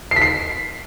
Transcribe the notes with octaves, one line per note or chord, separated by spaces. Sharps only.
C7
B6
C7